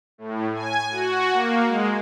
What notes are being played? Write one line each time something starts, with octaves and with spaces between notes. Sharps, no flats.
A2
G#5
F#4
A#3
G#3